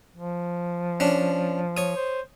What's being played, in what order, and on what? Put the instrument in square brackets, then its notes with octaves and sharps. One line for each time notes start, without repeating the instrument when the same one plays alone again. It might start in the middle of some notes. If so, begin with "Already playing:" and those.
[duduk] F3
[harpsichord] C#4 D4
C#5 D#6
[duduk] C5